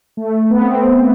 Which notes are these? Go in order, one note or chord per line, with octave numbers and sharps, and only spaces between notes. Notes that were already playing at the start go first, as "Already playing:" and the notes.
A3
B3
C4